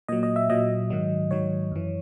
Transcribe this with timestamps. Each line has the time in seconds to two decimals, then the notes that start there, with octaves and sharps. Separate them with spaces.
0.09 A#2 F#3 D#5
0.23 D#5
0.36 E5
0.50 A#2 F#3 D#5
0.90 G#2 D#3 F#3
1.31 G#2 D#3 F#3 C#5
1.72 F#2 E3